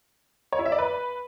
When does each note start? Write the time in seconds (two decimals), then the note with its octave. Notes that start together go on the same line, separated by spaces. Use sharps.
0.53 C#5
0.59 E4
0.65 E5
0.72 D5
0.78 B4